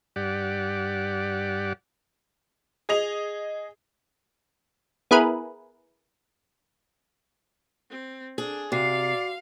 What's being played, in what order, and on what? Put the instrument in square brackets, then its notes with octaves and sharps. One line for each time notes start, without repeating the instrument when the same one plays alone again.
[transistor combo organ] G2 G4 D5 F#5
[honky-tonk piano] G#4 D#5 F7
[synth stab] B3 E4 G#4 A#4 B4
[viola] C4
[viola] D4 [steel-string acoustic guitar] G#4
[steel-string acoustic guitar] C3 [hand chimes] F#4 C7 [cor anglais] D5 [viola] F5